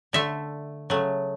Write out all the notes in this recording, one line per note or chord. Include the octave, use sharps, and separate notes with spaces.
D3 A3 E5
C#3 F#3 A3